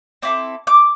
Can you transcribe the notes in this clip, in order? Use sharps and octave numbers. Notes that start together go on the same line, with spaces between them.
C4 E4 A4 D6
D6